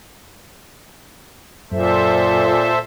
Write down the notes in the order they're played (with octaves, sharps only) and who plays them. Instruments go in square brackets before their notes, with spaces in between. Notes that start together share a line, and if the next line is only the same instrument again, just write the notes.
[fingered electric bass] F#2 [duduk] A#2 [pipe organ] A4 C5 E5